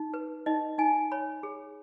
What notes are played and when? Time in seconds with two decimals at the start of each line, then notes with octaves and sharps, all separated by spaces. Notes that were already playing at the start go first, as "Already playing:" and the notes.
Already playing: D#4
0.14 B4
0.46 D#4 D#5
0.78 D#4 G#5
1.12 C#5 B5
1.43 G#4